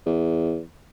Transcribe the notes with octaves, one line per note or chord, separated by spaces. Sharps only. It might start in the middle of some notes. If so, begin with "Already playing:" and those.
E2